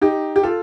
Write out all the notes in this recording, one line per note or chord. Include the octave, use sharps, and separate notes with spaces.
D#4 G4
G4
F4 A4